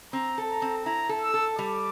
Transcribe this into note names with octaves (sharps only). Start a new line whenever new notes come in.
C4 A#5
A4
A#5
C4
E4 A#5
A4
E6
A4
G3 D6